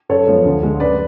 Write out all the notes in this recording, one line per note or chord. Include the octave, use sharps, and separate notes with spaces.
F#2 A4 C#5
F3 G#3 B3 F4
D2
D3 G#3
F#2 B4 D5